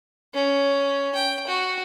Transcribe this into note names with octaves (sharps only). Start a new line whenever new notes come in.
C#4
G5
F#4